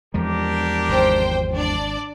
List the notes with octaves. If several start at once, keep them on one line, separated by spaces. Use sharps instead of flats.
E2 F3 G#3 D4 G4 A#4
G#1 C5 G5
D4 D5